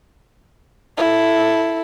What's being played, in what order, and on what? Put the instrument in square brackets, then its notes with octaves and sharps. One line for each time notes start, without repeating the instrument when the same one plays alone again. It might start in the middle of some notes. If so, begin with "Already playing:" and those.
[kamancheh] E4 A4